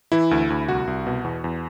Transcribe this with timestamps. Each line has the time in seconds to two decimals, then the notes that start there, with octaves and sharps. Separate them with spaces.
0.12 E3 E4
0.31 D2
0.50 D2
0.68 C2 F#4
0.87 C2
1.07 B2
1.24 E2
1.44 E2